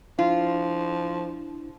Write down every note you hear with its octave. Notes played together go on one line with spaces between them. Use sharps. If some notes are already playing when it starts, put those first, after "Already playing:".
F3 D4 E4 F4